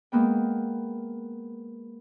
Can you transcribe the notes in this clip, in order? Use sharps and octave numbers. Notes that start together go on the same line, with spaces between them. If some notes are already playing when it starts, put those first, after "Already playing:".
G#3 A#3 B3 G5